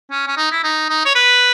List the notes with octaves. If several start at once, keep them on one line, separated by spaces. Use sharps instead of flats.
C#4
C#4
D#4
E4
D#4
D#4
C#5
B4